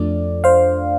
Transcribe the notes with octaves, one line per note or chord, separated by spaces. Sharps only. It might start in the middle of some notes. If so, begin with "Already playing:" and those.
Already playing: F2 F3 A3 D4 D5
C5 F5